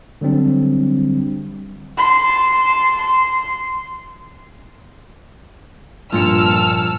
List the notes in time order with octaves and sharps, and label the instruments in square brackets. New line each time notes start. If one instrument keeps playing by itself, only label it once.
[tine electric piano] D3 F#3 G3 C4 D4
[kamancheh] A5 C6
C6
[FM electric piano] G2 C#7 [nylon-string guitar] A#2 F3 A#4 [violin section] A5 E6 F6